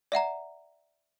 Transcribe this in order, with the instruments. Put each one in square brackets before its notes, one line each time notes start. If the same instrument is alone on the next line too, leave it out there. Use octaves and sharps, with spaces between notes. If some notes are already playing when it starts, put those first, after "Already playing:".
[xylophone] D5 E5 F#5 A#5